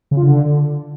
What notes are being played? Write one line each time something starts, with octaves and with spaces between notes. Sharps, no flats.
C#3
F4
D3